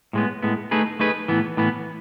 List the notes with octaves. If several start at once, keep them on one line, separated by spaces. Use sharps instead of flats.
A2 G#3 B3
A2 G#3 B3
A3 D#4 G#4 B4
A3 D#4 G#4 B4
A2 E3 B3
A2 E3 B3